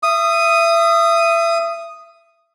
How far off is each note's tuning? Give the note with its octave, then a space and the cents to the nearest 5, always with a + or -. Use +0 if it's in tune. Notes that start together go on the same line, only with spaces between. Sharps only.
E5 +30 D#6 +0